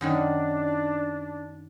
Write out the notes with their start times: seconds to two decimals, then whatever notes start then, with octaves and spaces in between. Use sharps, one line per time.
0.01 F#2 D#3 F#3 D4